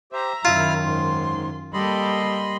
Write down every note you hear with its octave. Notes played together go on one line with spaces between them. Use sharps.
G4 C5 E5 A#5
F#2 D#3 E4 F4 F6
G#2 C6
G3 A#3 G4 A4 D#5 B5 C6